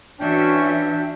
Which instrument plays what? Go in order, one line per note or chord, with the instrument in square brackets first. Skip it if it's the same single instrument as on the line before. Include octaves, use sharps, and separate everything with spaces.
[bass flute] E3 [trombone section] C#4 [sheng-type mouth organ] D4 G5 [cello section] F#4 E5